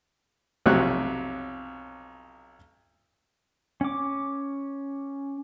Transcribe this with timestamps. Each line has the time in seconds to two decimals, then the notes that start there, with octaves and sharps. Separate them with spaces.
0.66 B1 F2 C3 F#3 C#5 F#6
3.81 C#4 D6